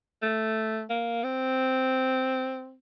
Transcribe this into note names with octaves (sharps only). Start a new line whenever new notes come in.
A3
A#3
C4